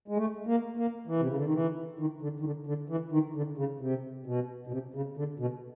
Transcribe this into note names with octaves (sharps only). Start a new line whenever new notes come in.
G#3
A3
A#3
A#3
E3
C3
C#3
D3
D#3
E3
D#3
D3
D#3
D3
D3
E3
D#3
D3
C#3
C3
B2
B2
C3
C#3
D3
B2